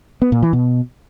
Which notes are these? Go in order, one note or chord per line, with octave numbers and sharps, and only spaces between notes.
B3
A#2
E3
B2